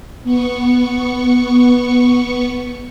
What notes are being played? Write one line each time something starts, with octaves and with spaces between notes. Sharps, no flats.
B3 C#6